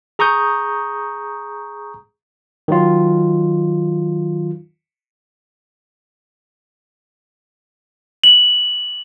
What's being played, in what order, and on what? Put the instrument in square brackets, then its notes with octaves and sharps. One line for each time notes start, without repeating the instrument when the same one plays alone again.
[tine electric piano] G#4 A#5 C#6 D#6 G6
D#3 F#3 F4
[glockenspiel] F#7